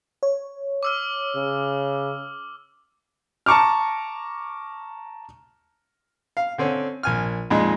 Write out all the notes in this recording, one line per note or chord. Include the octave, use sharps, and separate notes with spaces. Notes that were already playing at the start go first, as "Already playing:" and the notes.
C#5
D6 E6 F6
C#3
A5 A#5 C#6 D6 F6
F5
D3 C4 C#4
A#1 G#5 F6
F2 A#2 G#3 D#4